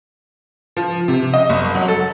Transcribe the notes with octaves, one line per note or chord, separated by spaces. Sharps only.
F3
C3
D#5
F#1
F#3
A4